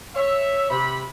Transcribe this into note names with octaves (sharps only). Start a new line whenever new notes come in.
C#5 E5
C3 B5